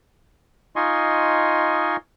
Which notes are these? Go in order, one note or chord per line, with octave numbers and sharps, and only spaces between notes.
D#4 F4 D#5 G#5 C6 C#6